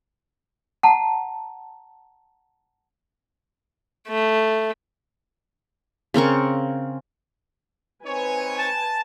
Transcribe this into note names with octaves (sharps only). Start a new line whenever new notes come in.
F#5 A5 A#5
A3
C#3 C4 A#4 C#6
C4 D#4 B4 C#5 G#5
A5